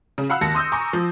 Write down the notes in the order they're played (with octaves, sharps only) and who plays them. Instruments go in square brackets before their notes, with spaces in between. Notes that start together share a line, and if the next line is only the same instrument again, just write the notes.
[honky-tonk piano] C#3
F5 F#5 B5 E6 F#6
D#2 A5 A#6 C#7
C6 D#6 E6 G6
G#5 A#5 C#6 D6 G6
F3